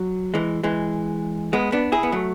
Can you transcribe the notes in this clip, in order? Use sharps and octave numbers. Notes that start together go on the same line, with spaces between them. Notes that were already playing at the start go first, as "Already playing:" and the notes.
Already playing: F#3
E3 G#3
E3 G#3
G#3 B3
B3 D4
E4 G#4
B3
F#3 A3